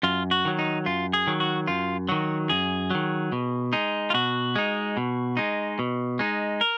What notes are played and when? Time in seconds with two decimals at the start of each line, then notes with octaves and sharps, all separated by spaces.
0.03 F#2 F4
0.31 F#4
0.45 D#3 F#3
0.59 D#4
0.86 F#2 F4
1.13 G#4
1.27 D#3 F#3
1.40 F#4
1.67 F#2 F4
2.09 D#3 F#3 F#4
2.49 F#2 G#4
2.91 D#3 F#3
3.32 B2
3.73 G#3 D#4
4.10 F4
4.14 B2 F#4
4.56 G#3 D#4
4.97 B2
5.37 G#3 D#4
5.79 B2
6.19 G#3 D#4
6.61 A#4